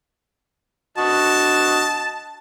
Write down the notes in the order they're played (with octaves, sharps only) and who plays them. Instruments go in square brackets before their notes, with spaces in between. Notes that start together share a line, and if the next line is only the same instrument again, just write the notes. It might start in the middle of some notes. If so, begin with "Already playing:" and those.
[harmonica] D3 F#4 D#5 [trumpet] A5